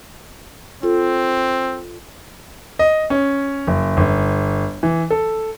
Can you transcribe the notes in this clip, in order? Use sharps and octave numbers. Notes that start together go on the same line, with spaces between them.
C4 F4 A4
D#5
C#4
F#1
G1
E3
A4